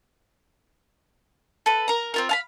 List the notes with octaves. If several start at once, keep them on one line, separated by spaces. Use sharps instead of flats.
A4 B4
A#4 A#5
C4 F4 A#4
F5 A5 B5